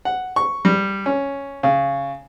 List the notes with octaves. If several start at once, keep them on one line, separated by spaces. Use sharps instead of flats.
F#5
C#6
G3
C#4
C#3